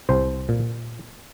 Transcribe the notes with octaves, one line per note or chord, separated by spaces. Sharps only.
C2 C5
A#2